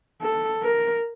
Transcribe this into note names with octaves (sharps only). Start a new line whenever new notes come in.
A4
A#4